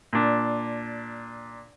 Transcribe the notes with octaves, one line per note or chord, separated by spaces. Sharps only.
A#2 D4